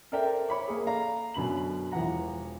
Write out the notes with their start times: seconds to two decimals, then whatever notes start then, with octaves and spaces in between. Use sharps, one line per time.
0.12 A4 A#4 C5 D5 E5 G5
0.49 C#5 B5 D6
0.68 A#3 G#4
0.87 A4 D5 F5 A#5
1.34 F#2 B2 D3 B5 F#7
1.92 E1 E3 F3 F#5 A#5